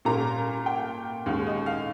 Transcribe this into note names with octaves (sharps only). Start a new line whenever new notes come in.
A#2 G3 A#3 C#4 F4 A#5
G5
D#2 D#3 G#3 C#4 F5
D#5
F5